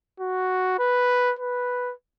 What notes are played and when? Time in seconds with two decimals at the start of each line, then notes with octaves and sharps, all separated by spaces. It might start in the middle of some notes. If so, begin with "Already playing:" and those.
0.20 F#4
0.79 B4
1.39 B4